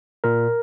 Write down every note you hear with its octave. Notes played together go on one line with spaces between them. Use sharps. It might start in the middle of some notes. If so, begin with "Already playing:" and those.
A#2 A#4